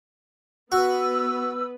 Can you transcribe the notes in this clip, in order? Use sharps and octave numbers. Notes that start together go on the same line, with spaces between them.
B3 F#4 B4 E6